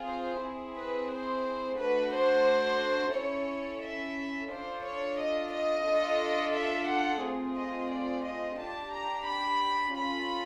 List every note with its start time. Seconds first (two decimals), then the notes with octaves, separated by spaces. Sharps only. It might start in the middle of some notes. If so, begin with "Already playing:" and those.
Already playing: C4 F4 G#4
0.09 C5
0.43 C4 E4 G#4
0.77 B4
1.11 C5
1.79 A3 D4 F#4 B4
2.13 C5
3.15 C#4 E4 A4 C#5
3.83 E5
4.51 D4 F4 A4 C5
4.86 C#5
5.20 D#5
5.54 D#5
5.88 D4 F4 A4
6.56 E5
6.90 F#5
7.24 A3 C4 F4 G#4
7.58 D#5
7.92 D5
8.26 D#5
8.60 D4 G4 A5
8.94 A#5
9.28 B5
9.96 C#4 F4 A4 B5